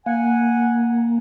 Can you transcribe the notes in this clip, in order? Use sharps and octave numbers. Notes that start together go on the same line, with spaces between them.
A#3 F#5 G#5